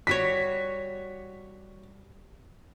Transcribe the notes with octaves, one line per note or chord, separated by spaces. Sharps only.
G3 F#4 C#5 B6